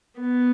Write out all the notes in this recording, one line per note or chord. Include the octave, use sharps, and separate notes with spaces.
B3